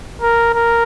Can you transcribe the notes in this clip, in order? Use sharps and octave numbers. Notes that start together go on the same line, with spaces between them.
A#4
A#4